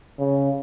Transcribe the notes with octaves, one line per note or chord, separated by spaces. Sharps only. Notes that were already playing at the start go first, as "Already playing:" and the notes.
C#3